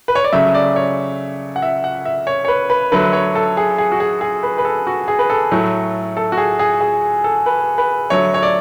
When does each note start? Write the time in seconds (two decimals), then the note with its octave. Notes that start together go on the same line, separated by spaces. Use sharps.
0.08 B4
0.15 C#5
0.24 D5
0.32 C#3 F#3 A3 E5
0.54 D5
0.76 C#5
1.56 F#5
1.62 E5
1.84 F#5
2.05 E5
2.27 C#5
2.45 C#5
2.48 B4
2.70 B4
2.92 D3 F#3 A3 B4
3.13 C#5
3.35 A4
3.57 G#4
3.78 G#4
3.92 F#4
4.00 G#4
4.21 G#4
4.43 B4
4.58 B4
4.65 A4
4.87 F#4
5.08 G#4
5.19 B4
5.30 A4
5.51 A2 F#3 A3
6.17 A4
6.32 F#4
6.38 G#4
6.59 G#4
6.81 G#4
7.24 A4
7.46 B4
7.78 B4
8.10 D3 F#3 A3 C#5
8.34 C#5
8.43 D5